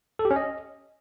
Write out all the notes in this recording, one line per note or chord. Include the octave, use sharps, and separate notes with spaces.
A4
G4
C#4
D#5